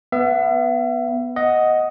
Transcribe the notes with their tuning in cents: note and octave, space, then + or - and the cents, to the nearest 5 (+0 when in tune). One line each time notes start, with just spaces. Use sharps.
B3 +0 E5 +40
D#5 +5 F#5 +0